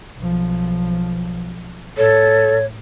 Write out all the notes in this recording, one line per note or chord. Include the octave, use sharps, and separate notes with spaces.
B1 F3
A2 A4 C#5